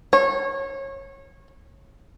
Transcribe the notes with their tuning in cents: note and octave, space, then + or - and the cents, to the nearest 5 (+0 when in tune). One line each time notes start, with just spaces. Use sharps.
C#5 -25